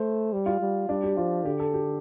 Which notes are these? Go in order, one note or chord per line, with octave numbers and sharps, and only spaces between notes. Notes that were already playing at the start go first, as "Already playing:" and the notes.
Already playing: A3 C5
G3
F4
G3
G3 D4
G4
F3 F4
D3 G4
A4
G4